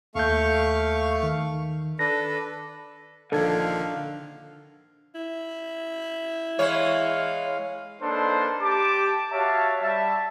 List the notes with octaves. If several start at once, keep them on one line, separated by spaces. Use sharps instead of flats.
D#2 A3 F5 C#6 G6
D#3
D4 A4 B4 A#6
A#1 D3 D#3 F3 A4 F5 A5 G#6
E4
E3 G#3 C#5 F5
A#3 D4 D#4 A4 B4 C5
G4 A5 D6
F#4 C#5 E5 F5 A5
G3 E5 A5